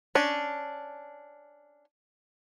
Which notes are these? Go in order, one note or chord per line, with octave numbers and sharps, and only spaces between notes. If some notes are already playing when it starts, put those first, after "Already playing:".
C#4 D4